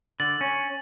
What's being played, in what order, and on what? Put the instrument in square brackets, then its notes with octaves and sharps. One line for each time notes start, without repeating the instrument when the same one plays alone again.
[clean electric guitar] D3 [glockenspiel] A6 F#7
[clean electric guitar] C#4